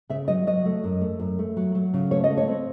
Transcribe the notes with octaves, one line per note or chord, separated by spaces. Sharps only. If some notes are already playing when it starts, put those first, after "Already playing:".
C#3 E5
F#3 D#5
F#3 D#5
A3
F#2
A3
F#2
A3
F#3
F#3
C#3
A3 C#5
D#5
A3
C#5
C4